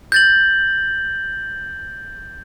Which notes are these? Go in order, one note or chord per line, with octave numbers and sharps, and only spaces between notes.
G6 A6 F#7